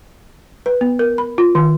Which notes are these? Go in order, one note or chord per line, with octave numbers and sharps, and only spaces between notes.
B4
B3
A#4
B5
F4
D#3